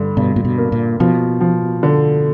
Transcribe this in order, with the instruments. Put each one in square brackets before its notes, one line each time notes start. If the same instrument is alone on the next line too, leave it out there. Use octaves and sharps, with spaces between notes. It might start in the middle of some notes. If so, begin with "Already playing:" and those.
Already playing: [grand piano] G2 D3
[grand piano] G2 [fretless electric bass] B2
[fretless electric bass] A#2
B2
[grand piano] A#3
[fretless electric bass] A#2
[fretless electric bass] B2 [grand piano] F3
[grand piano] F3
D3